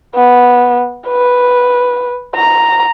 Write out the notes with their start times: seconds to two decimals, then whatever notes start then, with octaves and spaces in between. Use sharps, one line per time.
0.15 B3
1.08 B4
2.35 A#5